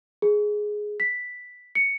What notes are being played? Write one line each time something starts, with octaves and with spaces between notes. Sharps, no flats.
G#4
B6
C#7